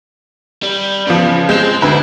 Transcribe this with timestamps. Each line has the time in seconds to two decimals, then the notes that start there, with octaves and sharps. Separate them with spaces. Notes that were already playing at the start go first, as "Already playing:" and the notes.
0.63 G3
1.07 C#3 F3 B3
1.49 G#3 C4 G6 E7
1.82 D2 D3 E4 B4